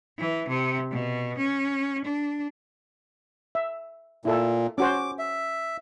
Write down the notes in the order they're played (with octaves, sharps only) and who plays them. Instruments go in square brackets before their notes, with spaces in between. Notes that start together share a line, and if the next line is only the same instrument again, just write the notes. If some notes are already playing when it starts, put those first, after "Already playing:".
[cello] E3
C3
B2
C#4
D4
[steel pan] E5
[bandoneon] A#2 [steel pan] E4 A4
[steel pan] C#4 F#4 C5 [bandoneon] D6
[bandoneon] E5